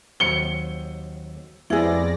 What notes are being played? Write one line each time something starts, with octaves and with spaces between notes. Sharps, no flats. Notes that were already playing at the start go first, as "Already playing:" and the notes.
D#2 F#3 C4 C#7 G7
F2 B3 E4 G#4 D5 A#6